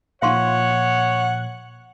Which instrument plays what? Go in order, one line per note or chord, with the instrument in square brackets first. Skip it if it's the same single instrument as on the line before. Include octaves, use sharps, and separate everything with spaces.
[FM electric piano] A#2 F3 [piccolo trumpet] C#5 [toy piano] F5 C6 C#6 [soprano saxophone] F#5